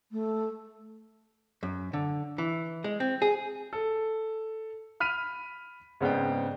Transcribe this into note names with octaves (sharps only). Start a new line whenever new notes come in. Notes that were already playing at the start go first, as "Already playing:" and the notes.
A3
F#2
D3
E3
G#3
C4
G#4
A4
B5 F6 B6 D#7
G#2 C#3 B3 C4 D5 G5